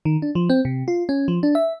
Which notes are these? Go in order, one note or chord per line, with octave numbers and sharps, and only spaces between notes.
D#3
D4
F3
C4
C3
F4
C#4
F3
D4
E5